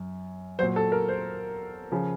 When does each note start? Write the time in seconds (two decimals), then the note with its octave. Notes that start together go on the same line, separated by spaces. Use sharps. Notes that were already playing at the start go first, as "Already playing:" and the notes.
Already playing: F#2
0.59 A#2 F#3 C5
0.76 A4
0.92 A#4
1.09 C5
1.92 C#3 F3